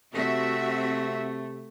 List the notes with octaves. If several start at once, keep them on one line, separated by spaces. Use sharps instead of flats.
C3 A3 C4 F#4 E5